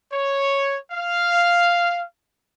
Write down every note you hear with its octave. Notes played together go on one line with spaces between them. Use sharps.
C#5
F5